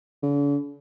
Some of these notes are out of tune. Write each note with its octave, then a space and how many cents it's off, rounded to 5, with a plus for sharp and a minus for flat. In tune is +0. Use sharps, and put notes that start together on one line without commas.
D3 -45